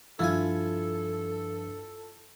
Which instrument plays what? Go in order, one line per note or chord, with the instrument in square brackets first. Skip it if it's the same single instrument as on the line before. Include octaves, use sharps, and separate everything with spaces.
[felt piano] G2 F3 E6 [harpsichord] E4 F4 G#5 [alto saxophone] A4